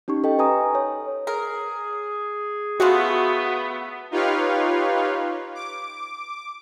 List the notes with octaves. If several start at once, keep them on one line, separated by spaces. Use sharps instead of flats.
C#4 D#4 G4 C#6
A4 D#5 G5
B4 G#5 A#5 D#6
C#5
G#4 A#4
A3 B3 C#4 F4 F#4
D#4 F4 G4 B4 C#5 F5
D6